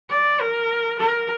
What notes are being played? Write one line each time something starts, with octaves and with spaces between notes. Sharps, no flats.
D5
A#4
A#4